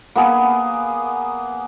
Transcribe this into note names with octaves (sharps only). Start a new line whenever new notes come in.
A#3 B3 G#4